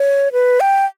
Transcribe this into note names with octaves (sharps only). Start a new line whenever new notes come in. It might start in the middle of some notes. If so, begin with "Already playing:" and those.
Already playing: C#5
B4
G5